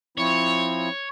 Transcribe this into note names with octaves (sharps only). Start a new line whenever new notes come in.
F3 C4 E4 C#5